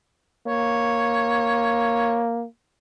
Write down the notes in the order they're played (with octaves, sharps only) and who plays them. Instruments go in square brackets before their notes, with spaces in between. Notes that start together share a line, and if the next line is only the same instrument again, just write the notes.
[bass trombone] A#3 [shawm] C#5